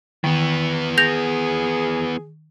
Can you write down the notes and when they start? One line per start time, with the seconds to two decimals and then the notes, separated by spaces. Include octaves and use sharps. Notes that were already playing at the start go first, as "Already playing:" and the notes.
0.24 D#3 E3 B3
0.98 G#4 G6 A#6 F7